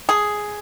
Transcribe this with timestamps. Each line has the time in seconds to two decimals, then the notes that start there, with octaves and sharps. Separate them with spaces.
0.09 G#4